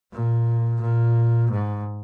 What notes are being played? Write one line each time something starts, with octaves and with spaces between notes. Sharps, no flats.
A#2
A#2
G#2